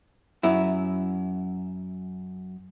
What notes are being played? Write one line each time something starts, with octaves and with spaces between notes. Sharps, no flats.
F#2 E4